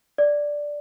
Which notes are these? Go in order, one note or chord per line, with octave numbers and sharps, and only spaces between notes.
D5